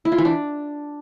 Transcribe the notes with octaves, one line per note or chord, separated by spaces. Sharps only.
E4
F4
E3
D4